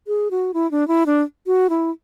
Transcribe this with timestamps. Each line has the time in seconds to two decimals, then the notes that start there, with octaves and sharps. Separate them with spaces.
0.07 G#4
0.31 F#4
0.54 E4
0.71 D4
0.88 E4
1.06 D4
1.47 F#4
1.70 E4